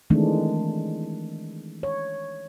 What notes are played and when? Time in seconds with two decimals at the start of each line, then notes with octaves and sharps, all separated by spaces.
0.10 D#3 E3 G#3 A3 C4 D4
1.83 C#5